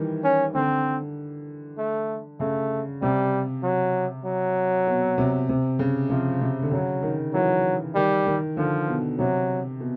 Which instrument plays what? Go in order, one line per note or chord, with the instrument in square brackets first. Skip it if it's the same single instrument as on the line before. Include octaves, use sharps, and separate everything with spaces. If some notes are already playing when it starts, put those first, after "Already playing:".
Already playing: [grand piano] D#3 E3 G3
[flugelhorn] C#4
[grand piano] D3 [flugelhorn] C4
[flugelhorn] A3
[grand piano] C#3 [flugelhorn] A3
[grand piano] C3 [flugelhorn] G3
[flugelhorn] F#3
F#3
[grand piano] B2
C3
C3
C#3
[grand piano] C3 [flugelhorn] F3
[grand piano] C3
D3
[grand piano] C#3 [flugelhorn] F#3
[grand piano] D#3
[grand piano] E3 [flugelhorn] F#3
[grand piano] D#3 [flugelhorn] G3
[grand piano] D#3
[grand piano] D3 [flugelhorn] F3
[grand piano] B2
[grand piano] C3 [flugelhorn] F#3
[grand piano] B2